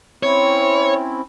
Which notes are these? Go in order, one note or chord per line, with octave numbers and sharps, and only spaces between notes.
C4 C#4 E4 C#5